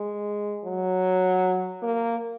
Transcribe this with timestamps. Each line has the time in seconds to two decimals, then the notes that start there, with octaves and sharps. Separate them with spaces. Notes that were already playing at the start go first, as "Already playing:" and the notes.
Already playing: G#3
0.65 F#3
1.82 A#3